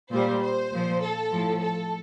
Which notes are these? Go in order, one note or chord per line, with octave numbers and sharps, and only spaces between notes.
A#2 G3 C5
C5
A#2 F3
A4
A2 F3
A4